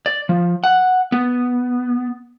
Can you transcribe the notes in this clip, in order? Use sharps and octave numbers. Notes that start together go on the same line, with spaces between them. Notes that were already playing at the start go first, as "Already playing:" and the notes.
D5
F3
F#5
B3